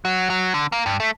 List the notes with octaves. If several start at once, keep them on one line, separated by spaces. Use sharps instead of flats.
F#3
F#3
D3
A#3
G2
A3